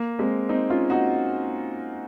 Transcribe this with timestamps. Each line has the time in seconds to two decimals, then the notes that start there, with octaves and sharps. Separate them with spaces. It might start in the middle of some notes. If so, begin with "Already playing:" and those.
Already playing: A#3
0.19 G#3 C4
0.49 C4 D#4
0.70 C#4 F4
0.90 D#4 F#4